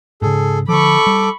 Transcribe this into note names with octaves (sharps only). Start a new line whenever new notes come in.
G#2 C#3 G#4 A4
D3 D#3 F3 A4 B5 C#6 D6
G3